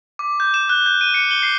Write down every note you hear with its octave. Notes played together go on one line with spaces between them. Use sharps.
D6
G6
E7
F#6
G6
D#7
C#7
G7
C7